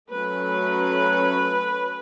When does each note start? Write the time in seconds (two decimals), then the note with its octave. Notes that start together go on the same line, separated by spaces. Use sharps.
0.11 F#3 A3 C#4 B4